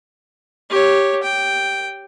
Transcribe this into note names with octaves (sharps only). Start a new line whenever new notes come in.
G4 C#5
G5